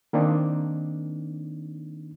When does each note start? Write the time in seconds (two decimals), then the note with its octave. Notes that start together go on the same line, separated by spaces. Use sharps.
0.13 D#3 A#3 C4 D4 D#4